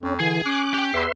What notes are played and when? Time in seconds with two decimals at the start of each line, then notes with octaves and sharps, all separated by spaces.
0.03 F2 C#4
0.20 D3 E3 G#4 G#5
0.46 C#4 D6 F#6
0.74 G4 G5
0.94 E2 B4 E5 C6